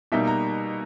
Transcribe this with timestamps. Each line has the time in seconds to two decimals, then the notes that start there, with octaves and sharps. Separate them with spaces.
0.12 B2 G3 A#3 D#4 E5
0.27 A#5